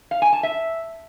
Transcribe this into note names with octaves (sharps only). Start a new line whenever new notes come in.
F5
G#5
A5
E5